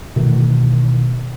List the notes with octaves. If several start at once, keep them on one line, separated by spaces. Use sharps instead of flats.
B2 D#3 E3 A3